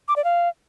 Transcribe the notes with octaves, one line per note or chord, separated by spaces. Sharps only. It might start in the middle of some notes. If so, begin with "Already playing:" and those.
D6
D5
F5